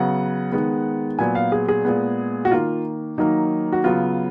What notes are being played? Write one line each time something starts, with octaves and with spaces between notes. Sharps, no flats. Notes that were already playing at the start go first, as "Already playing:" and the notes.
Already playing: C#3 F#3 B3 F#5
D#3 G#3 B3
A#2 F#3 B3 G#5
F5
G#4
G#4
A#2 G#3 B3
F#4
D#3 A#3 F4
D#3 F#3 A#3 D#4
F#4
C#3 F#3 B3 F4